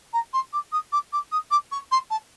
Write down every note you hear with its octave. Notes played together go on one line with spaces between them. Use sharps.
A#5
C6
D6
D#6
D6
D6
D#6
D6
C#6
C6
A5